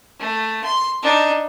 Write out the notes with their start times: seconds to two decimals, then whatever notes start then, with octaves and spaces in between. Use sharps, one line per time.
0.20 A3
0.64 C6
1.02 D4 D#4